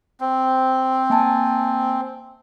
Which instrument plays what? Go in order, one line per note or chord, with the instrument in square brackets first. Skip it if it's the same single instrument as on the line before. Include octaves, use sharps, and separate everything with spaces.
[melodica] C4
[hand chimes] A#3 G#5 A5